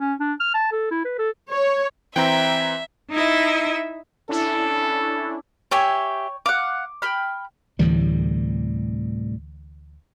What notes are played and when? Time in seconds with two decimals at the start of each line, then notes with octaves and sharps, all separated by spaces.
0.01 C#4
0.20 D4
0.40 F6
0.54 A5
0.72 A4
0.91 E4
1.05 B4
1.19 A4
1.51 C#5
2.16 E3 C4 E5 G5 A#5
3.10 D#4 E4 D#5 E5
4.29 C#4 D4 E4 A4
5.71 G4 C#5 E5 G5 G#5
6.46 F5 F#5 D6
7.02 G5 B5 F6
7.79 D2 A2 C3 E3 G3